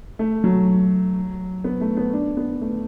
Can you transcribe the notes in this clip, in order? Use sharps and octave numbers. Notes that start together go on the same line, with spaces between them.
A3
F#3
B3
A3
B3
D4
B3
A3